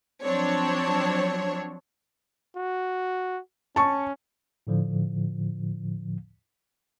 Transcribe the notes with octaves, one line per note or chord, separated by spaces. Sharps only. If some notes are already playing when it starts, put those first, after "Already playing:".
F3 F#3 C4 D4 C#5
F#4
C#4 A5 C#6
A2 D3 F3